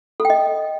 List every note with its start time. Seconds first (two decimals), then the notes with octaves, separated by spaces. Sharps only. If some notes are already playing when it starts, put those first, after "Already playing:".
0.20 A4
0.25 G5
0.30 D#5